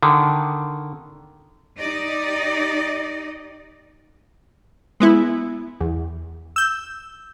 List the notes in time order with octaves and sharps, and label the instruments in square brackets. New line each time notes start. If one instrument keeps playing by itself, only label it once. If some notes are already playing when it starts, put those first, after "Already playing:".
[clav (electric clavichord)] D3 D#3
[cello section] D#4 G4 D5 D#5
[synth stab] G#3 B3 E4
E2
E6 G6